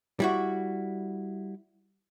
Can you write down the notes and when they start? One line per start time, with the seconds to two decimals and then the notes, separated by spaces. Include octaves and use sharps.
0.20 G3 E4 F#4